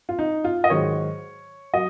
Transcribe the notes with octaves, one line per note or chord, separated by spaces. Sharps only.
F4
D#4
F4
D#5
G#2 D#3 F#3 C#5
F#3 D#5